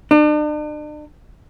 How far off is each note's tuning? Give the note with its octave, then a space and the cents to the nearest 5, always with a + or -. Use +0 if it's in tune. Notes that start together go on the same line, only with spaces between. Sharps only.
D4 +40